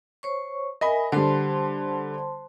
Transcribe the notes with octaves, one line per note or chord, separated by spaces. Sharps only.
C5 C#5 C#6
A#4 D#5 E5 G#5 B5
D3 G3 C5 A5 C6